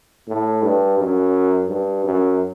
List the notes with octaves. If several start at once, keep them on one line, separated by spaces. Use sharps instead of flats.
A2
G2
F#2
G2
F#2